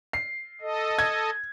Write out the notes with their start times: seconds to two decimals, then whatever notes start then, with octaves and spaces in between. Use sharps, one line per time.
0.13 C7
0.61 A4 D#5
0.99 G#6